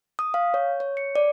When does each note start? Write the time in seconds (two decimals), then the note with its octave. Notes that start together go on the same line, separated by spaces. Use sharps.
0.19 D#6
0.34 F5
0.54 C#5
0.80 C#5
0.97 C#7
1.16 D5